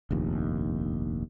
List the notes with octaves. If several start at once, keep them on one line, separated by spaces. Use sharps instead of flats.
F1 A#1 D#2